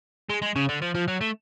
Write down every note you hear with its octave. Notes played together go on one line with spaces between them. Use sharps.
G#3
G#3
C#3
D3
F3
F3
F#3
A3